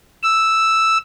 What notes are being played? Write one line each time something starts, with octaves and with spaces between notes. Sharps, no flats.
E6